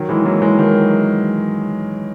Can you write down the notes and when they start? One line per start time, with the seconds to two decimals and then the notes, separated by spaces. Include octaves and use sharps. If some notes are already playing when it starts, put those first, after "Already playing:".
Already playing: D#3 F#3
0.09 E3 G#3
0.25 F#3 A#3
0.42 E3 G#3
0.59 D#3 F#3